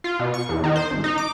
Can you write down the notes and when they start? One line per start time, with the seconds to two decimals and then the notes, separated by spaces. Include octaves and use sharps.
0.04 F4
0.19 B2
0.34 C#6
0.49 E2
0.64 D#3
0.76 C5
0.91 G#1
1.04 D#4
1.18 D6